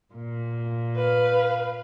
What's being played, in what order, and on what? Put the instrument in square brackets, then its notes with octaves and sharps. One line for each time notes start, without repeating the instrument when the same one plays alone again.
[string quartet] A#2
[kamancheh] B4 F5